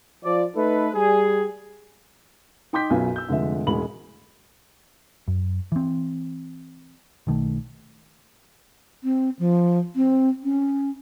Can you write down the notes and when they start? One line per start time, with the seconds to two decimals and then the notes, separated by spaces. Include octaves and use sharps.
0.24 F3 D5
0.56 A3 D#4 A4 B4
0.95 G3 G#4
2.73 D#4 G5 C6 D6 G6 B6
2.90 B1 F#2 B3 F4 G#5
3.16 E6 G6
3.29 F1 D3 F3 G#3 E5
3.67 E1 A1 G#3 B5 F#7
5.28 F#2
5.72 E3 C4
7.27 B1 D#3 A3
9.04 C4
9.39 F3
9.96 C4
10.44 C#4